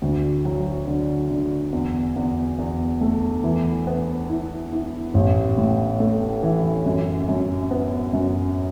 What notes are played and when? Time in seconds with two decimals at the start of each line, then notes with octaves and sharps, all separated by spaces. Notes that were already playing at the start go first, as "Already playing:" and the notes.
0.02 D2
0.45 F#3
0.87 D3
1.30 D3
1.73 E2
2.16 E2
2.59 E2
3.01 A3
3.44 E3
3.87 B3
4.29 E4
4.73 E4
5.14 A1
5.58 A2
6.00 A3
6.43 E3
6.86 F#2
7.29 F#2
7.71 B3
8.13 F#2